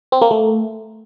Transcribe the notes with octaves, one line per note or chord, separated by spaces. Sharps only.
C4
A#3
A3